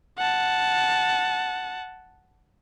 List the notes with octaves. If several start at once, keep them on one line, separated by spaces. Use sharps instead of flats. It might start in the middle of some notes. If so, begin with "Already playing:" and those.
F#5 A5